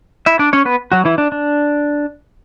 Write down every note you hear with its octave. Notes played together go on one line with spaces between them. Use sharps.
E4 E5
D4 D5
C#4 C#5
B3 B4
F#3 F#4
E3 E4
D4
D4